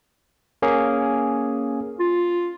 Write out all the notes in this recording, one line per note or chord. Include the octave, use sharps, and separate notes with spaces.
A#3 C#4 G#4
F4